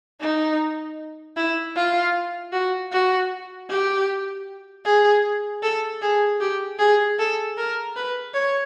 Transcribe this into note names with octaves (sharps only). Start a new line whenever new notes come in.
D#4
E4
F4
F#4
F#4
G4
G#4
A4
G#4
G4
G#4
A4
A#4
B4
C#5